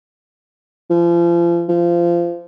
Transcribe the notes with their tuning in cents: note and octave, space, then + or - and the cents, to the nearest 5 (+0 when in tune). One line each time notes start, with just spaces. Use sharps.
F3 -35
F3 -25